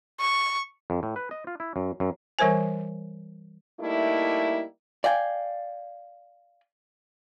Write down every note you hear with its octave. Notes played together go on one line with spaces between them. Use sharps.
C#6
F2
A2
B4
D#5
F4
E4
F#2
F#2
E3 G3 A#4 C5 G#5
G3 A3 A#3 D#4 E4
D5 F5 G5 G#5